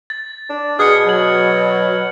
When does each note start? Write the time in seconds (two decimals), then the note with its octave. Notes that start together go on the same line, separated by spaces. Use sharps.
0.10 A6
0.49 D4
0.79 B2 G#4 F6 F#6 C#7
1.06 F#3 G#6 F#7